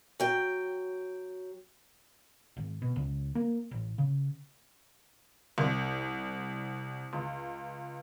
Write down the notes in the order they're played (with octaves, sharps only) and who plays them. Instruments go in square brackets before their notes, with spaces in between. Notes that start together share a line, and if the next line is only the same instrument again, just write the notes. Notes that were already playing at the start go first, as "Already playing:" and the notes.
[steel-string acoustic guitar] F#3 G5
[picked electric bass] G#1
B2
C#2
A#3
A1
C#3
[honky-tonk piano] C2
C#2